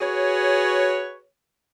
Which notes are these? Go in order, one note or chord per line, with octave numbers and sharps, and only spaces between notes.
F#4 G#4 B4 C#5